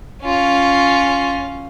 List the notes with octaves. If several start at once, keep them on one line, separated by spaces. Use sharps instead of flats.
C#4 F4